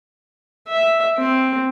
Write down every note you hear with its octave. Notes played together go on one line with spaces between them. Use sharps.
E5
C4